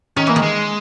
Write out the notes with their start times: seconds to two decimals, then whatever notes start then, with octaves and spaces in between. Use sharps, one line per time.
0.17 D#3 C#4
0.27 E3 A#3
0.36 D#3
0.42 G#3